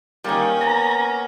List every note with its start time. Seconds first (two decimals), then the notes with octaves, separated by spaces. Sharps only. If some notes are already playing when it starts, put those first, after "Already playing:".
0.24 D#3 G3 A#3 C#4
0.61 B3 A#5